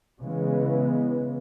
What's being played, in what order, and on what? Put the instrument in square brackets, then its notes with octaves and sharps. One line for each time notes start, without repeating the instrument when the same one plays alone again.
[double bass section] C#3 E3 G#3 B3